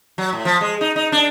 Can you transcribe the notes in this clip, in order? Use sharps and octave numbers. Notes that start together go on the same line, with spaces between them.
F#3
A2
F3
G#3
D#4
D#4
D4